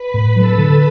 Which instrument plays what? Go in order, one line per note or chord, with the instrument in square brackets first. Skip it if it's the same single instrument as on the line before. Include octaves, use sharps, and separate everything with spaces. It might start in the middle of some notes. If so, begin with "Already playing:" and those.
Already playing: [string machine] B4 B5
[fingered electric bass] A2
[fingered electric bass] F#3 [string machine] A4 A5
[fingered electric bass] D3